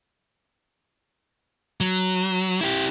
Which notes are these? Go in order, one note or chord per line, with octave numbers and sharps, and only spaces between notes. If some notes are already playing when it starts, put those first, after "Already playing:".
F#3
E4 G4